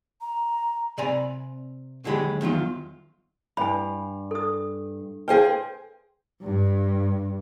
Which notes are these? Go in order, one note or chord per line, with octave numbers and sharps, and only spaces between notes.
A#5
C3 D5 G#5 A#5 B5
D#2 D3 F#3 G#3 G4 B5
E2 D#3 F#3 F4
G2 G#5 B5
A4 D#6
G#4 B4 C5 F5 G5
G2